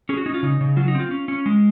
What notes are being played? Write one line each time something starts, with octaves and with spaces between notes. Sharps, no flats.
C#4 G#4
F#4
C#4 D#4
F4
C#3 D#4
C#3
F#3 F4
D#4
C4 F4
C#4
C#4
G#3